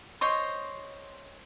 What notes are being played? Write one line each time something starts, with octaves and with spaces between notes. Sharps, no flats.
C5 C#5 D#5 C6